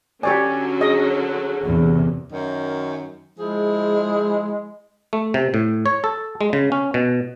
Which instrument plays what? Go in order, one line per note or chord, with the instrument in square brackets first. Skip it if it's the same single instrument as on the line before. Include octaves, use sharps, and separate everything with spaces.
[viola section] D3 F#3 C#4 [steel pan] G4 C#5 D5 [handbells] G#5
[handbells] G#4 [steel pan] D#5
[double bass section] E2 C3
[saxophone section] F#2 D#3
[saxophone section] F3 E4 G#4 [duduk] G#3
[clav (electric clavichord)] A3
C3
A2
C#5
A4
G#3
C#3
C#4
B2